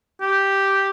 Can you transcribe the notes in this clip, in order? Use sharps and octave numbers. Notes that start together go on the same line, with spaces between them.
G4